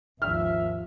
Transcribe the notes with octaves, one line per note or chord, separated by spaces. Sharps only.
G#1 D#2 F3 E5 F6